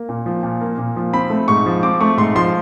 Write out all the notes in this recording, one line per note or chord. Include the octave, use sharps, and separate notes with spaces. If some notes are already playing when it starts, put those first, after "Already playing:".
Already playing: A#3
A#2
F3
A#2
A#3
A#2
F3
C4 B5
A3
G#2 C#6
F3
C4 D6
A3 C#6
G#2 C6
F3 C6